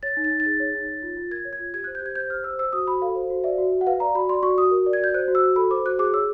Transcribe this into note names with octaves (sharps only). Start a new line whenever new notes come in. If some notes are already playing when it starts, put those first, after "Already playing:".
C#5 A6
D#4
A6
D#4
A6
G#4
C#5
D#4
C#5
F4
F4
A#4 G#6
C#5
G#6
F4
G4 G#6
C5 F#6
G6
G4 G#6
C5 G6
G4 F6
C5 E6
C5 E6
F#4 D#6
F#4 B5
A4 F5
C5
F#4
D5 E5
F#4
F#4
F#5
B4 F5
D5 A#5
F#4 B5
D5 C6
F#4 C#6
F#4 D#6
A#4
D5
G#6
F#4 G6
C5 F#6
F#4
E6
F#4
A4 B5
C5 D6
F#4 F#6
G#4 D6
C#5 E6